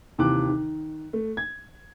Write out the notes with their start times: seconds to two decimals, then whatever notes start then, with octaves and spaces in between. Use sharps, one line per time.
0.18 D#2 C3 E3 D6 F#6
0.49 D#3
1.13 A3
1.37 G#6